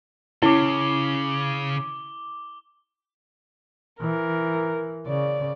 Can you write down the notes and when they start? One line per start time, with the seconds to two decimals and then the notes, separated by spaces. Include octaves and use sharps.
0.43 C#3 C#4 E4 D6 G7
4.01 E3 A#4
5.07 C#3 D5